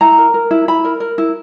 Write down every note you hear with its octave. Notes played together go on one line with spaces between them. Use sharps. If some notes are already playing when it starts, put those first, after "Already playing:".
E4 A#5
A#4
A#4
E4
E4 B5
A#4
A#4
E4